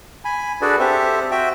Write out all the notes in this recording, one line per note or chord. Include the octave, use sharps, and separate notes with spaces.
G#5 B5
D4 F#4 G#4 A4 B4 D5
C4 G4 A4 C5 E5
F#4 E5 G5